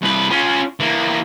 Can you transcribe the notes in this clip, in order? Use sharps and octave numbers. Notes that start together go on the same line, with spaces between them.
C2 B4
C#4 F4
E3 A#3